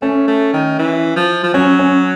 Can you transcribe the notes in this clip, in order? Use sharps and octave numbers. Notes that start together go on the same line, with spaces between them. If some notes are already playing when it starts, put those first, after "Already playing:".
A3 C#4
A3
D#3
E3
F3
F3
F#3 C#4
C#4